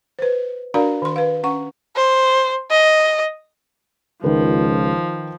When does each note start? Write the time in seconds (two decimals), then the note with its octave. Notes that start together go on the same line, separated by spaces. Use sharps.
0.19 B4 C5
0.74 D4 F#4 A#4 D5 F5 A#5
1.02 D#3 C6
1.16 B4 F5
1.43 C#4 F#5 C#6
1.96 C5
2.71 D#5
4.24 C#2 D#3 F3 B4